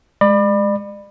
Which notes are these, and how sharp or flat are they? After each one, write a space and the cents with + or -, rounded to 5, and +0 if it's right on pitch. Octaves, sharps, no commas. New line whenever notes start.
G#3 +0 D5 +35 B5 +0